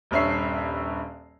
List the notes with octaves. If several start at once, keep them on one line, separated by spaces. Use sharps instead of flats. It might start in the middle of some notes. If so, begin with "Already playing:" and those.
D#1 G2 C#5 E5 C7